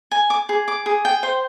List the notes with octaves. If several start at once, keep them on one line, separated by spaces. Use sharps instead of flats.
G#5
D6
G#4
D6
G#4
G5
C5